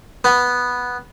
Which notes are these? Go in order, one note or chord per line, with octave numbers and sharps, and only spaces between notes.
B3